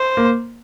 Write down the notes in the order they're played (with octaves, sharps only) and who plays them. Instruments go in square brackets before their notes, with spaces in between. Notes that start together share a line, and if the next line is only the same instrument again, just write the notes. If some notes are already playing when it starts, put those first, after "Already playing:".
Already playing: [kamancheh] C5
[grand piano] A#3